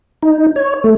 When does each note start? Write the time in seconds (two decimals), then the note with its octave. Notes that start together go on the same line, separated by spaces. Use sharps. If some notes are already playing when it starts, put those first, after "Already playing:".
0.23 D#4
0.56 C#5
0.84 A3